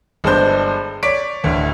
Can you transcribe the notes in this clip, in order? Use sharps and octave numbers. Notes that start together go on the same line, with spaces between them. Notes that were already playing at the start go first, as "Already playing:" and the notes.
G1 G#3 D4 C5 G6
C#5 D5 B6 D7
D1 D2